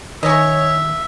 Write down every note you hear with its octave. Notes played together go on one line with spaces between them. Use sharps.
D#3 C#4 C#5 D#5 E5